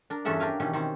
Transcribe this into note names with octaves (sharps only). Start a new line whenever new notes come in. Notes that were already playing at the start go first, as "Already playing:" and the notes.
D4 A#4
E2 G2 C#4 A4 E5 F#5
D4 G4 A#4 F5 G#5
B2 D#3 E3 C#4 G4
D#3 C4 C#4